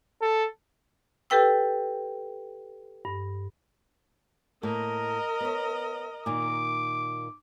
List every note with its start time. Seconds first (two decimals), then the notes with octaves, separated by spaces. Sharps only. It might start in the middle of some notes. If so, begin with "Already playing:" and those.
0.22 A4
1.30 G4 A4 B4 G5 E6
3.05 G2
4.63 A2 A#3 A#4 D#5
5.41 B3 C#5
6.26 A#2 D#3 D6